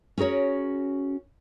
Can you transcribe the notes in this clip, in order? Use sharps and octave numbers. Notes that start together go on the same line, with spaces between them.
C#4 F#4 G#4 A#4 C#5